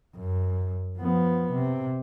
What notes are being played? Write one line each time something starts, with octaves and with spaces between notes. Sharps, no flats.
F#2
F3 B3
C3